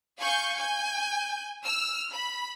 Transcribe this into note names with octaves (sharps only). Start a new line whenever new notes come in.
F5 G#5 C#6 G6
G#5 G6
E6 F6
B5